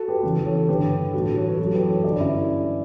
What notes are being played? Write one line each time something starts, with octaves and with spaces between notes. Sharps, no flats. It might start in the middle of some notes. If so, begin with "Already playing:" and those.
Already playing: F#4 A4
G4 B4
E2 C#3 E3
A4 C#5
G2 D3 G4 B4
A2 E3 F#4 A4
C#5
B4
F#2 E3 F#4 A4
G4 B4
A4 C#5
G2 D3 B4 D5
C#4 E4